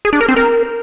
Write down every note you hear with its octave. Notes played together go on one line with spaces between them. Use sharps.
G#4
D4
A#4
C4
A#4